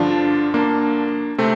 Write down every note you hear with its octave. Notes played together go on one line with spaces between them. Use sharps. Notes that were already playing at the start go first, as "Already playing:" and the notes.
Already playing: G2 D3 F3 D4 F4
A#3 D4
C3 A3 C4